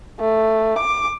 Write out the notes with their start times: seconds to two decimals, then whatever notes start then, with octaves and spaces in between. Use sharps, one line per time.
0.20 A3
0.79 D6